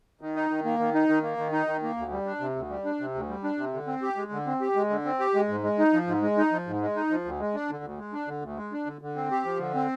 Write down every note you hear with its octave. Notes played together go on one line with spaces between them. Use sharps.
D#3
D#4
D#3
A#3
D#3
D#4
D#3
A#3
D#3
D#4
D#3
A#3
D2
G3
D4
C3
D2
G3
D4
C3
D2
G3
D4
C3
D3
C4
G4
G#3
D3
C4
G4
G#3
D3
C4
G4
G#3
G#2
G#3
D#4
F3
G#2
G#3
D#4
F3
G#2
G#3
D#4
F3
D2
G#3
D4
D3
D2
G#3
D4
D3
D2
G#3
D4
D3
D3
C4
G4
F3
D3
C4